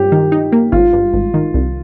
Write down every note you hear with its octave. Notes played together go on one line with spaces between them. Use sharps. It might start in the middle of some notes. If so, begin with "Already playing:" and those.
Already playing: G2 G4
D#3
D#4
A#3
G#1 F4
G2
G#1
D#3
C2